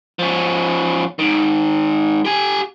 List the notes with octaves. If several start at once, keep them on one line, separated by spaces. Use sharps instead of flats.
F3 C#4
G#2 D#3
G4 G#5